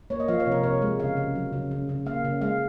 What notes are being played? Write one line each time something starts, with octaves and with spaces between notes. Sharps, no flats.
A#3 C#5
D#5
F3 F5
C#5
C3
A#4
C3 C#5
G#3
C#3 F5
C#3
F#3
C#3
C#3
C#3
A#3 F5
C#3
G#3 F5